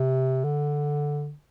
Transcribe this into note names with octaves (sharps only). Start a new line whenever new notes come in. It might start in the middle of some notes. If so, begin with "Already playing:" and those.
Already playing: C3
D3